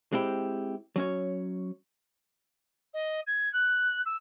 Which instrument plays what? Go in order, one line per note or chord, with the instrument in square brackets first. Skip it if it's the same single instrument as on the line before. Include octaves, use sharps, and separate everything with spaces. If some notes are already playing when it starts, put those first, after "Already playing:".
[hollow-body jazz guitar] G#3 C4 E4 G4
F#3 C#4 C#5
[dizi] D#5
G#6
F#6
E6